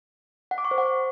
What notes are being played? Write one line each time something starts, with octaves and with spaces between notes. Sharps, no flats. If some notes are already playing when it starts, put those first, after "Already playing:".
F#5
D6
C#6
C5
F#5